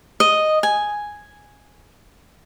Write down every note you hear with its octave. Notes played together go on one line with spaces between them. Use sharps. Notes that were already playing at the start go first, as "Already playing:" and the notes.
D#5
G#5